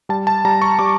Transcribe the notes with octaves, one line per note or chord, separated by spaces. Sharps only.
G3 A5
A5
G3 A#5
C#6
G3 D6